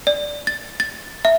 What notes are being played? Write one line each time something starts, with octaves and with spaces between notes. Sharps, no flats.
D5
A6
A6
E5